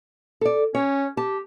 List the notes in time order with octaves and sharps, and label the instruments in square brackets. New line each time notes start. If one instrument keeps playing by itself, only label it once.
[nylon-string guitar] A4 D5
[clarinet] C#4 [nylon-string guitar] C#5
[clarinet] G4 [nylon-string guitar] A5